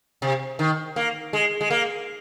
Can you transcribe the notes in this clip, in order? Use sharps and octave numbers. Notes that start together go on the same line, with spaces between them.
C3
D#3
A#3
G#3
G#3
A#3